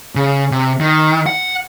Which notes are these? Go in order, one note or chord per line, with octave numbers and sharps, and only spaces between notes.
C#3
C3
D#3
F#5